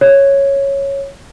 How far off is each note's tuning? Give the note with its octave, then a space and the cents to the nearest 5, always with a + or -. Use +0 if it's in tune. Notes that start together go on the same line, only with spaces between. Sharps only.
C#5 -5